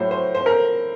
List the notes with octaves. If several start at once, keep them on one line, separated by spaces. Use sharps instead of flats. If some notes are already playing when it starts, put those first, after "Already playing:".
Already playing: A2 F#3 C5
C5
C5
A#4